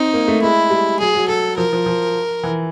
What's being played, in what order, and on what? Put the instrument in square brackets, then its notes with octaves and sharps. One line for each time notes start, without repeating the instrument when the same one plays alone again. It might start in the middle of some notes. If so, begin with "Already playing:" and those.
Already playing: [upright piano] C4 [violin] D#4
[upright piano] A#3
A3
[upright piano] G#3 [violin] E4
[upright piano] G3
[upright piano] F#3 [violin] G#4
[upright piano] F#3
[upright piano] F#3 [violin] A4
[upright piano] F3 [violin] A#4
[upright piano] F3
F3
E3